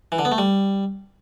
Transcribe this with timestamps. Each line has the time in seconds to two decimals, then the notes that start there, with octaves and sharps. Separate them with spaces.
0.12 E3
0.19 D3
0.25 B3
0.32 A3
0.38 G3